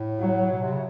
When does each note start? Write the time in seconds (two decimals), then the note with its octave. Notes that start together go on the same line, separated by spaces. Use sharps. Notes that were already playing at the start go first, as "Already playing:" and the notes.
Already playing: A2
0.19 F#3
0.50 B2
0.61 C3
0.73 C#3